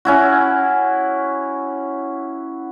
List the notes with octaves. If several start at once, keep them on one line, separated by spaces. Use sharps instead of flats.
C#4 E4 F#4